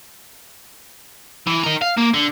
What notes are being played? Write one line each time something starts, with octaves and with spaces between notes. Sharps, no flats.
E3
D#4 A#4
F5
A#3
D3